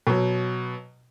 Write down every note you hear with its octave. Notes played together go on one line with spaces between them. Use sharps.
B2 F#3